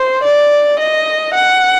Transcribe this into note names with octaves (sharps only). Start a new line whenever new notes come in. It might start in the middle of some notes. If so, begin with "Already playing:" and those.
Already playing: C5
D5
D#5
F#5